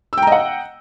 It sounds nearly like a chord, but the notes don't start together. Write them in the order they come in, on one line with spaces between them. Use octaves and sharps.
E6 G5 A#5 D#5 F#5